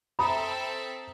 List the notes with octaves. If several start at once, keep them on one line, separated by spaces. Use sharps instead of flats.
C4 A4 E5 A#5 B5 D#6